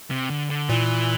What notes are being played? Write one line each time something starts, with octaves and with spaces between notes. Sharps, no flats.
C3
D3
D3
A#2 E3